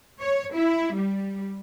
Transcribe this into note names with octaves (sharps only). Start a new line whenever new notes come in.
C#5
E4
G3